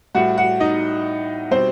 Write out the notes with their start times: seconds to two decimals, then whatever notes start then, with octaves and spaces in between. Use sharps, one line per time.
0.15 A2 G3 F#4 F#5
0.38 F#4 F#5
0.60 D#4 D#5
1.51 B2 G3 C4 C5